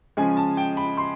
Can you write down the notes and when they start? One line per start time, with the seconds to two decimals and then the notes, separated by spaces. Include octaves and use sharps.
0.17 C#3 F3 G#3 C#4 G#5
0.37 A5
0.57 G5
0.77 B5
0.97 C6